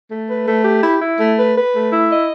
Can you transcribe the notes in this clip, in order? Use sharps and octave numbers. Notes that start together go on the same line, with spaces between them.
A3
B4
A3
G4
E4
E4
A3
B4
B4
A3
E4
D#5